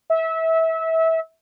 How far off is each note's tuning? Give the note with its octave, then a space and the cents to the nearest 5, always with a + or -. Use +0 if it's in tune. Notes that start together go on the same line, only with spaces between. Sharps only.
E5 -25